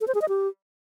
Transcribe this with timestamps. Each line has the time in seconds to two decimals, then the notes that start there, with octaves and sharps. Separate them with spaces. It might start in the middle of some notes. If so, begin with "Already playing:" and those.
0.01 A4
0.08 C5
0.15 G#4
0.22 D#5
0.29 G4